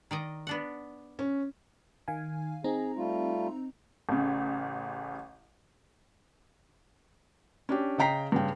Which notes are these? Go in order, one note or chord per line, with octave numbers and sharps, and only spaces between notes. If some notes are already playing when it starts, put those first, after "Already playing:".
D#3 D5 D#5
B3 D4 F#5
C#4
D#3 F5 G#5
C4 D#4 G#4 A#5
G3 A3 F4
A1 C#3
C#4 D4 G4
C#3 D#5 G5 A#5 B6 C7
G2 C#3 G5